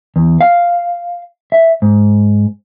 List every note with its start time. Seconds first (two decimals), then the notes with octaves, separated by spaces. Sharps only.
0.16 E2
0.41 F5
1.52 E5
1.82 G#2